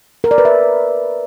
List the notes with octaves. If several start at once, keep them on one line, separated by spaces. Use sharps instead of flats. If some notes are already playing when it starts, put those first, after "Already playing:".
A#4
D5
B4
E5